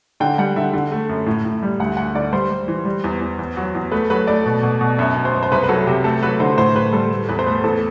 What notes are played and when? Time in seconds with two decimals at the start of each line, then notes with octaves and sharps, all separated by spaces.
0.20 D3 G5
0.38 G3 F#5
0.56 D3 E5
0.73 D3
0.92 A3
1.09 F#2
1.26 A2
1.45 A2
1.63 G3
1.79 D2 F#5
1.97 D2 F#5
2.15 D3 D5
2.33 G3 C5
2.51 G3
2.68 E3
2.85 G3
3.04 E2
3.21 E2
3.39 E2
3.57 F#3
3.75 E2
3.92 A3 B4
4.10 F#3 B4
4.27 A3 D5
4.46 B2
4.63 B2
4.81 B2
4.98 F#2 E5
5.15 F#2
5.25 C5
5.34 F#2
5.43 C5
5.51 C2 B4
5.64 B4
5.69 F#3 A4
5.87 C3 G4
6.04 A3 A4
6.22 F#3 B4
6.40 D3 C5
6.57 A2 C5
6.75 A2 B4
6.93 G3 A4
7.11 A3
7.29 E2 B4
7.39 C5
7.46 A3 B4
7.64 E2 A4